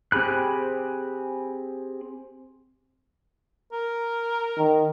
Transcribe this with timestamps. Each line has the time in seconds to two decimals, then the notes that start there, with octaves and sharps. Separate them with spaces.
0.12 C4 G4 G#4 B5 F#6
3.73 A#4
4.58 D#3